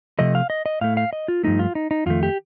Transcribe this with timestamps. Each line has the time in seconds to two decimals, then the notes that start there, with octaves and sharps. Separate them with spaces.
0.19 C3 F3 A3 D#5
0.35 F5
0.50 D#5
0.66 D#5
0.81 A2 A3 F5
0.97 F5
1.13 D#5
1.28 F4
1.43 G2 F3 A3 D#4
1.59 F4
1.75 D#4
1.91 D#4
2.06 F2 D#3 A3 F4
2.23 G4